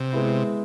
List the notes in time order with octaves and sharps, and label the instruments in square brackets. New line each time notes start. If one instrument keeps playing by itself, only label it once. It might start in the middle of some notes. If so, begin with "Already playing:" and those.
Already playing: [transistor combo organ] C3
[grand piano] G#3 B3 E4